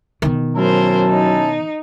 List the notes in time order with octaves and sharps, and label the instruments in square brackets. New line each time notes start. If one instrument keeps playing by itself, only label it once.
[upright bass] B2 D#3
[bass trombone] F#3 [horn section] C#4 E4 A5 [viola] A#4 C5
[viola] D#4